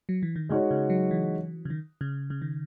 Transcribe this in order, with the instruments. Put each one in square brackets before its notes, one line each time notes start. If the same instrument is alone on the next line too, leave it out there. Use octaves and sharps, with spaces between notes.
[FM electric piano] F#3
E3
D#3
[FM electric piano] C#3 [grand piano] G#3 D#4 F#4 C#5
[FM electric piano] C#3
F#3
E3
C#3
D#3
C#3
C#3
D#3